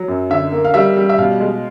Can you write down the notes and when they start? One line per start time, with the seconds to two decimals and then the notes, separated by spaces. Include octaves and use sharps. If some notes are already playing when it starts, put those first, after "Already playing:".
Already playing: F#3
0.08 F#2
0.30 D3 E5
0.52 A#3
0.65 F5
0.74 G3 E5
0.97 G3
1.09 E5
1.18 B2 F5
1.40 G#3